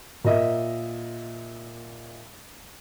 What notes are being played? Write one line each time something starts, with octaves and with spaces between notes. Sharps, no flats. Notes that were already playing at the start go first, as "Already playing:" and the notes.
A#2 D#5 E5